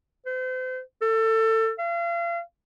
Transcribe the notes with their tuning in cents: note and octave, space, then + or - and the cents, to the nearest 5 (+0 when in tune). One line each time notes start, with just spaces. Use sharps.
C5 -35
A4 +25
F5 -35